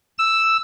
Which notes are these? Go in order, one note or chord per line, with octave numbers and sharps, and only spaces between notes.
E6